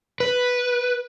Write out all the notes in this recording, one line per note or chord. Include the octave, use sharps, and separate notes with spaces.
B4